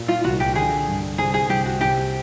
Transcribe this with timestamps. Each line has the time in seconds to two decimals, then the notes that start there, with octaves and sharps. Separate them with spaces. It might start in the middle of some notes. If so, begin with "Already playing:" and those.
Already playing: A#2
0.08 F4
0.24 C2 F#4
0.40 G4
0.55 D3 G#4
0.88 G2
1.18 C3 G#4
1.34 G#4
1.50 C2 G4
1.65 F#4
1.81 C3 G4